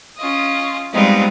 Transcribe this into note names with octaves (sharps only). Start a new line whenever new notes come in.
C#4 F4 D#5
G3 G#3 B3 C4 D#4 F4